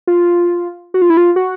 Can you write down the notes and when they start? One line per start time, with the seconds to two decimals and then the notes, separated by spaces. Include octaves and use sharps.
0.07 F4
0.94 F#4
1.02 F4
1.10 E4
1.17 F4
1.36 F#4